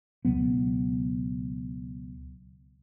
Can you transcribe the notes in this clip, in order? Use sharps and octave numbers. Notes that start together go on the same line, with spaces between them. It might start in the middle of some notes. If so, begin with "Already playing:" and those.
C#2 B2 F#3 B3